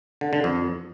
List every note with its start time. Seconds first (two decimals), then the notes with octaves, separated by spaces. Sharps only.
0.21 D3
0.33 D3
0.44 F2